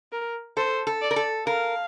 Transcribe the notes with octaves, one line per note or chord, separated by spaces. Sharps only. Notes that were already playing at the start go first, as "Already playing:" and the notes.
A#4
A4 C5
A4
D5
A#4
A4
A#4 F5